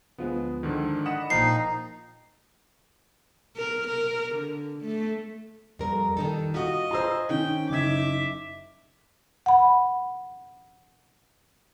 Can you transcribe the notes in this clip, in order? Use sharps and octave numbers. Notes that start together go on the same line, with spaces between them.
D2 F3 G#3 B3
G#2 D3 D#3
D5 D#5 F#5 B5 D#6 E7
A#1 F3 A#3 D#4 G5 C7
A#4
A#4
D3
A3
F2 G3 A#4
D#3 D#4 A4
F4 F#4 D#5
F4 G#4 C5 A#5 E6
D#3 C4 C#4 G5
F#1 D#4 E5 D6 G#6
F#5 B5